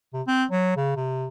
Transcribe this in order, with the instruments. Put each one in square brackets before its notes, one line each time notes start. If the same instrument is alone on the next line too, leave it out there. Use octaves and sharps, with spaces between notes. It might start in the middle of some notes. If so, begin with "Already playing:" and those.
[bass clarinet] C3
C4
F#3
C#3
C3